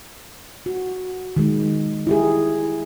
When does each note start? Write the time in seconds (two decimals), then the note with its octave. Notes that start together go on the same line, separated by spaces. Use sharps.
0.66 F#4
1.36 D#3 G#3
2.07 E4 G4 G#4